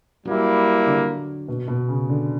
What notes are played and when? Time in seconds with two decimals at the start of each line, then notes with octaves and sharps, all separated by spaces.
0.25 F#3 G3 A#3 E4
0.87 D3
1.48 B2
1.68 B2
1.88 C#3
2.10 D3